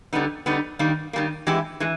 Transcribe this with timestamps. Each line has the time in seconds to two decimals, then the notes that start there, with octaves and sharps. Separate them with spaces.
0.13 D3 G3 B3 D#4
0.46 D3 G3 B3 D#4
0.79 D#3 G3 A#3
1.13 D#3 G3 A#3
1.47 E3 G#3 B3 E4 G4
1.80 E3 G#3